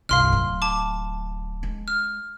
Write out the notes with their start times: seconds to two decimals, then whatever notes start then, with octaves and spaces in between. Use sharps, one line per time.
0.09 C2 G2 F5 C6 F6
0.32 D1
0.62 A5 D6
1.63 G#3
1.88 F6